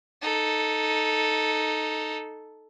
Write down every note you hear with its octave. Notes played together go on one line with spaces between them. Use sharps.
D#4 A4